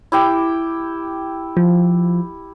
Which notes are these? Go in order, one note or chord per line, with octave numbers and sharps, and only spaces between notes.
E4 G4 G5
F3